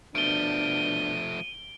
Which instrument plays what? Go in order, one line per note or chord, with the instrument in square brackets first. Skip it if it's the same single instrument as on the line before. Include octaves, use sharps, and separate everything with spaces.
[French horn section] B2 D4 [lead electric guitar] F3 A3 [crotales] D7 G7 [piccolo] D#7